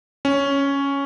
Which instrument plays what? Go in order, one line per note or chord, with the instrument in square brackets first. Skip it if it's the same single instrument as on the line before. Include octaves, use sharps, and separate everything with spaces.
[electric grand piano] C#4